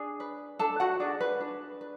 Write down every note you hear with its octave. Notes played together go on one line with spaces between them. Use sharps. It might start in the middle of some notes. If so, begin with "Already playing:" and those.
Already playing: D4 G#4 G#5
B4
D4 A4 A5
F#4 F#5
D4 G#4 D5
B4
D4
B4